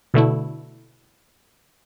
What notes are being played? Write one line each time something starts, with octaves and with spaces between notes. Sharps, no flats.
B2 D3 A3 E4